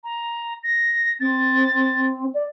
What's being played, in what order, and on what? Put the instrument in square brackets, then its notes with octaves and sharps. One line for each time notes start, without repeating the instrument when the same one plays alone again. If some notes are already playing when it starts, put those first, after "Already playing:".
[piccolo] A#5
A#6
[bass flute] C4 [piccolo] A6
[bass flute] D5